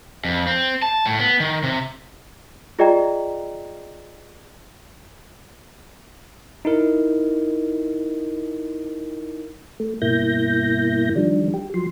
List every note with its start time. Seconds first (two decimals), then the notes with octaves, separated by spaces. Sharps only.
0.24 F2
0.47 C4
0.82 A5
1.06 A2
1.20 B3
1.40 D#3
1.63 C3
2.79 F4 G#4 D5 D#5 G5 A#5
6.65 D#4 E4 A#4
9.80 A3
10.02 G2 B2 A#3 E4 G6 A#6
11.16 D#3 F3 G3 D4
11.54 G4
11.74 F3 F#3 C6